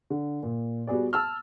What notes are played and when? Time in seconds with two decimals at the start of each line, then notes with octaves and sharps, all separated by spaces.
0.10 D3
0.43 A#2
0.87 G3 B3 F#4 G#4 D5
1.13 A5 E6 F6